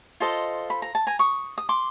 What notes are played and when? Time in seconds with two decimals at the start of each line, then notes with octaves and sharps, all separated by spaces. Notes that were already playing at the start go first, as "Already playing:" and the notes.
0.20 F4 A4 C5 D#5
0.70 B5
0.82 A#5
0.95 A5
1.07 G#5 A#5
1.19 C#6 D#6
1.58 D#6
1.69 C6 D6